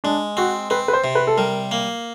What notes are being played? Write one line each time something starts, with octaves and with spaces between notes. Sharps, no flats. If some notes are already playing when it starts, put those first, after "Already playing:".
G#3 D4
C4 F#4
C4 B4
B4
C5
C3
B4
A4
G3 A#4
A#3